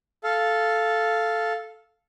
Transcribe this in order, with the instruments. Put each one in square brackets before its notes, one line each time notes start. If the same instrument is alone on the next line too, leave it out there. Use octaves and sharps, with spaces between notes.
[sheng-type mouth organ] A4 F5